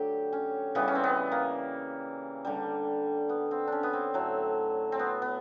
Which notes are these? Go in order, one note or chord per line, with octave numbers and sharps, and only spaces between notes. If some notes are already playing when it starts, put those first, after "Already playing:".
Already playing: D3 F#3 A3 G4
C#4
C#3 E3 G3 B3
C#4
C4
B3
A#3
D3 G3
B3
C4
C#4 D4
B3
C4
A2 F#3 A3
C4
B3
B3